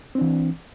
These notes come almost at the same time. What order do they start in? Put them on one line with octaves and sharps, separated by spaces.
C4 D4 E3